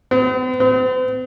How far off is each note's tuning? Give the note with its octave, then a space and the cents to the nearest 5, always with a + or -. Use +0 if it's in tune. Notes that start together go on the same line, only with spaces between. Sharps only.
C4 -45
C4 -40